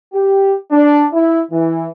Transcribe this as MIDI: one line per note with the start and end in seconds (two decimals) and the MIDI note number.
0.13 0.55 67
0.71 1.06 62
1.13 1.41 64
1.51 1.87 52